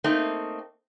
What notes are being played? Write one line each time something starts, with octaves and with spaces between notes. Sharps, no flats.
A3 A#3 C4 D#4